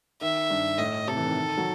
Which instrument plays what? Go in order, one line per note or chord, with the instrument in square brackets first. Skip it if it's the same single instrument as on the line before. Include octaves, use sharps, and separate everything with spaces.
[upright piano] D#3 [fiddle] E5
[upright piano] G2
[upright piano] A2 [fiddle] D#5
[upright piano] C3 [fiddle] A4
[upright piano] E3
D#3
F#3